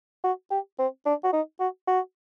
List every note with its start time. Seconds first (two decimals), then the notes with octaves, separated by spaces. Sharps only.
0.24 F#4
0.51 G4
0.79 C4
1.06 D4
1.24 F#4
1.33 D#4
1.60 F#4
1.87 F#4